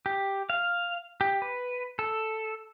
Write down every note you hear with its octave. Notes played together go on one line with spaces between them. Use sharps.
G4
F5
G4
B4
A4